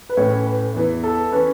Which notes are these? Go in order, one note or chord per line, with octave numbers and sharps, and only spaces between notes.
B4
A2 E3 C#4 C#5
B4
E2 E3 B3 E4
A4
E3 C#4 B4